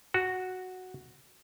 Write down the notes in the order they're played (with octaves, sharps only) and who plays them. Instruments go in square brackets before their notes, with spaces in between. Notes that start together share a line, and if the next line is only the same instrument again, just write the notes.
[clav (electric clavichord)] F#4